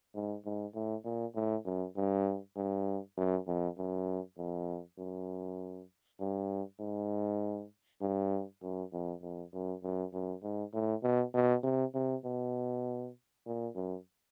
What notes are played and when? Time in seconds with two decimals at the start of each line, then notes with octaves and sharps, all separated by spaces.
0.15 G#2
0.45 G#2
0.74 A2
1.04 A#2
1.35 A2
1.65 F#2
1.96 G2
2.56 G2
3.17 F#2
3.47 F2
3.77 F#2
4.38 F2
4.98 F#2
6.20 G2
6.80 G#2
8.01 G2
8.62 F#2
8.92 F2
9.22 F2
9.53 F#2
9.83 F#2
10.13 F#2
10.43 G#2
10.73 A2
11.03 B2
11.34 B2
11.64 C3
11.94 C3
12.25 B2
13.46 A#2
13.75 F#2